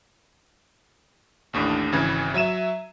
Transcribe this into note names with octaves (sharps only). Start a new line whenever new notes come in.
A1 D#2 A2 D4
G#1 C#3 E3 G#6
F#3 E5 D#7 E7